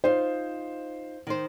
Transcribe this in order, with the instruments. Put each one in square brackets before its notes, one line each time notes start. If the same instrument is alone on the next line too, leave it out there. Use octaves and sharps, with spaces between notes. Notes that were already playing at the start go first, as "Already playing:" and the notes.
[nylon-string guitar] D#4 F4 [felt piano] C5
[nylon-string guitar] D#3 D#4 C5